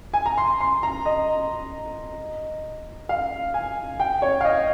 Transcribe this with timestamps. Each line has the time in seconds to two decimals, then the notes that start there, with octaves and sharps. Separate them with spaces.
0.14 G#5
0.26 A#5
0.38 C6
0.61 C6
0.83 A#5
1.05 D#5
3.09 F5
3.54 G#5
4.00 G5
4.22 C#5
4.41 F5
4.45 D#5